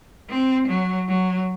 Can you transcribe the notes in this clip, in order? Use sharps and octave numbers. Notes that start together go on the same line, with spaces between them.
C4
F#3
F#3